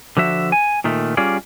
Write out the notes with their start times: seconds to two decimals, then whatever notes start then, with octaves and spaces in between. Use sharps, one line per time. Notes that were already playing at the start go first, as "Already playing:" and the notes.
0.17 D3 F3 F#4 E5
0.52 G#5
0.84 A#2 D#3 A3
1.17 G3 C#4 F4 G#4 D5